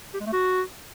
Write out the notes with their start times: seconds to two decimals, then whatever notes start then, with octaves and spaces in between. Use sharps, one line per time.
0.14 G4
0.20 G#3
0.27 A3
0.33 F#4